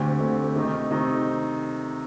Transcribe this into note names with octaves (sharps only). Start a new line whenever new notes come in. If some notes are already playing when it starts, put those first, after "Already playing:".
Already playing: D2 D3 A3 C4 G4
D2 D3 A3 C4 G4
C3 D#3 A3 D#4
C3 D#3 A3 D#4